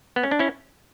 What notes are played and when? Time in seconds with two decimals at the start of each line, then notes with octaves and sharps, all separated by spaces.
0.16 B3
0.23 C#4
0.31 D4
0.39 C#4 E4